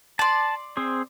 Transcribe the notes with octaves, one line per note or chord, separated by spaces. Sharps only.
D5 A5 C6
C4 G#4 C5